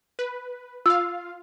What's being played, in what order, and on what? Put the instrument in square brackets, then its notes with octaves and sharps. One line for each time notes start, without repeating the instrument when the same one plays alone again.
[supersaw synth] B4
[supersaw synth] F4 F5 [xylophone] E6